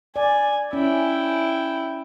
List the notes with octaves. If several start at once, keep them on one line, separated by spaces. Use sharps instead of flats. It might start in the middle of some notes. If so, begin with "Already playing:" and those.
D5 G#5
C#4 E4 G5